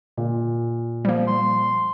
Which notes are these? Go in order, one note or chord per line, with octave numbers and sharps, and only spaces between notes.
A#2
F3 G3 A#3
C6